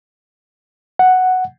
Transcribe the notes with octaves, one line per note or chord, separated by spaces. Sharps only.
F#5